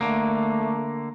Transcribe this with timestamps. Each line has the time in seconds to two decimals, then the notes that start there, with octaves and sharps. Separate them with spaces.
0.01 D3 A3 A#3